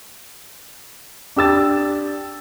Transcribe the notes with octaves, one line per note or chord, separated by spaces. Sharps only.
D4 G4 E6 A6